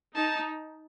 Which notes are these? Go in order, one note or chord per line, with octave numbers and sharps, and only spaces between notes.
D#4 A5